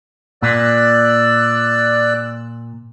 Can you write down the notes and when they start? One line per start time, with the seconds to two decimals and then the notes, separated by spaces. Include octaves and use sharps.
0.42 A#2 D5 E6 F#6